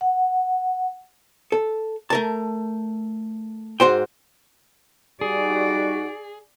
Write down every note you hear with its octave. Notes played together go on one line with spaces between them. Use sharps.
F#5
A4
A3 A#4 A5
G#2 F#4 C5 G5
G3 D#4 F#4 G#4 D5